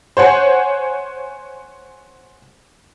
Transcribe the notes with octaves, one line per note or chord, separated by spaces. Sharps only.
C5 C#5 F#5 G#5